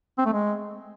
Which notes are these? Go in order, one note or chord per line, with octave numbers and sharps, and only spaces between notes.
C4
A3
G#3